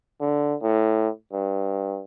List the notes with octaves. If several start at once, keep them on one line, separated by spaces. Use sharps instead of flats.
D3
A2
G2